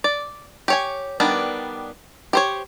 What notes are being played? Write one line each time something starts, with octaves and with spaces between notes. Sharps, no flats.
D5
G4 C#5 G#5
D#3 G3 B3 D4
G4 C5 C#5